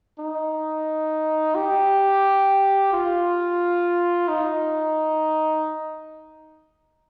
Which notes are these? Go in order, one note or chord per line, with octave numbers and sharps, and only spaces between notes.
D#4
G4
F4
D#4